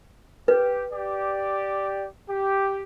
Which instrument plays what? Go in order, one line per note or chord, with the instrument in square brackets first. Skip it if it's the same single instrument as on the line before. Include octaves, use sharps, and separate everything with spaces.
[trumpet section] G4 [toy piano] B4
[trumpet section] G4 D5
G4